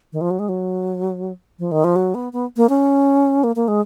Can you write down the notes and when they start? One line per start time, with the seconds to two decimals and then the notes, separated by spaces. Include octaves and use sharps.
0.12 D#3
0.21 F3
0.30 F#3
0.39 G#3
0.49 F#3
1.59 F3
1.71 D#3
1.84 F3
1.96 F#3
2.14 B3
2.33 B3
2.57 A#3
2.69 C#4
3.44 A#3
3.56 A#3
3.68 G#3